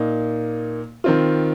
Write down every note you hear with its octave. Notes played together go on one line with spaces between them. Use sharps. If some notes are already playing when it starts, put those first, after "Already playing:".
Already playing: A#2 A#3 D#4
D#3 C4 F4